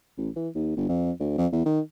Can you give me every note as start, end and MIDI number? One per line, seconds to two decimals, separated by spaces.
0.18 0.29 33
0.36 0.49 52
0.55 0.76 39
0.76 0.84 31
0.89 1.12 41
1.20 1.35 38
1.38 1.47 41
1.52 1.65 40
1.66 1.80 51